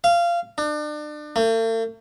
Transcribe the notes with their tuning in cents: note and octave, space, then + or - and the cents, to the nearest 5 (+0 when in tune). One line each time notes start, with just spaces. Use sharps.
F5 -20
D4 +35
A3 +45